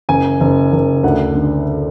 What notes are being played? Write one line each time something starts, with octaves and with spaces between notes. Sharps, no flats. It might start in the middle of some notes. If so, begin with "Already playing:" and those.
F#1 G#5
F#1
F#1
D2 F#5
D3